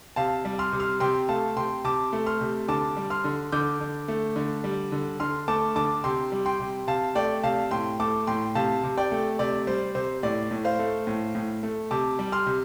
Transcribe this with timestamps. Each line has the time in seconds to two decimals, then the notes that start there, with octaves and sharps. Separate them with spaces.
0.16 C3 F5 A5
0.45 G3
0.59 C6 F6
0.72 C3
0.80 C6 F6
1.00 C3 G5 C6
1.29 A3 F5 A5
1.57 C3 G5 C6
1.84 C3 A5 D6
2.13 A3
2.26 C6 F6
2.41 C3
2.68 D3 A5 D6
2.97 G3
3.10 C6 F6
3.24 D3
3.52 D3 D6 G6
3.80 D3
4.08 A3
4.36 D3
4.64 G3
4.92 D3
5.20 D3 C6 F6
5.48 A3 A5 D6
5.76 D3 A5 D6
6.04 C3 G5 C6
6.32 G3
6.46 G5 C6
6.60 C3
6.87 C3 F5 A5
7.15 A3 D5 G5
7.43 C3 F5 A5
7.71 A2 G5 C6
8.00 A3 A5 D6
8.27 A2 G5 C6
8.55 C3 F5 A5
8.83 C3
8.98 D5 G5
9.11 A3
9.39 C3 D5
9.67 G3 C5
9.95 C3 C5
10.23 A2 D5
10.51 A2
10.65 C5 F5
10.79 A3
11.07 A2
11.35 A2
11.63 A3
11.91 C3 A5 D6
12.19 G3
12.32 C6 F6
12.47 C3